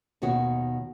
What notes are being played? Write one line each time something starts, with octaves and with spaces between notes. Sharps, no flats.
D#2 B2 D#3 F#4 C#5